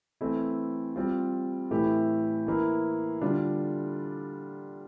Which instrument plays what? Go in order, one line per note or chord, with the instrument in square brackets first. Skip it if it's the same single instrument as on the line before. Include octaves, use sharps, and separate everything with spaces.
[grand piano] E3 A3 C4 E4
G3 C4 F4
A2 E3 A3 E4 G4
E3 A#3 E4
D3 G3 D4 F4